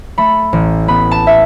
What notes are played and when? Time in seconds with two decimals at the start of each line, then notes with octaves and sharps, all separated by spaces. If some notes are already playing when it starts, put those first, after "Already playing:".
0.18 A3 B5
0.53 A1
0.88 B3 B5
1.11 A5
1.27 E5